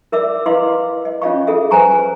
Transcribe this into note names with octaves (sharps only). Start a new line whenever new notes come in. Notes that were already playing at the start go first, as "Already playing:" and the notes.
A#4 D5 E5 D6 E6
E4 B4 D#5 F5 C6 D6
D#5
C#4 F4 C#5 D#5 F5 C#6
F4 G#4 A4 E5
B4 C5 G#5 A#5 C#6